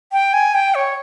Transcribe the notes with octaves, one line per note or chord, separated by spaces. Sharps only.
G5
G#5
G5
C#5